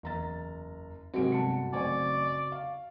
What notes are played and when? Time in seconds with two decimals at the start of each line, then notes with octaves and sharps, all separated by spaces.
0.03 F#1 E2 A#5 A6
1.14 G#1 C3 F#3 G#3 C4 F#4 D7
1.32 G1 A5 C#7
1.73 A1 F#2 C#3 C4 D5 G#5 C#6
2.52 F5